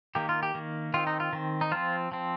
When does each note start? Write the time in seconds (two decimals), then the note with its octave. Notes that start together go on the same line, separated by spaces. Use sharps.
0.15 D#3 A#3 G4
0.29 F4
0.43 G4
0.54 D#3 A#3
0.94 D#3 C4 F4
1.07 D#4
1.20 F4
1.33 D#3 C4
1.61 D#4
1.71 F3 C4 F4
2.12 F3 C4